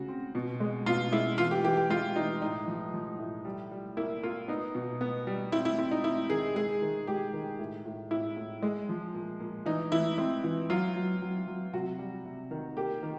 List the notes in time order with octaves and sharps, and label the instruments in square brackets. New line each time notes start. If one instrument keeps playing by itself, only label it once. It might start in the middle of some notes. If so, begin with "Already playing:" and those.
Already playing: [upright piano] C#3 F#4
C4
B2
G#3
B2 F4
G#3 E4
E3 F4
G4
E3 G4
G4
G#3 F4
E3 D#4
A2 D#4
F3
F3
A2
G3
G3
A#3 E4
A#3 F4
B3 D#4
B2
B3
G3
C4 E4
E4
C4 E4
D#4
C4 E4
D#3 G#4
G#3 G#4
D#3
G#3 G4
D#3
A2
A2
A2 E4
A2
G#3
F3
A#2
A#2
E3 D#4
E3 E4
C4 E4
E3
F#3 F4
F#3
F#3
F#3
C3 F#4
G3
C3
D#3
A#3 G4
D#3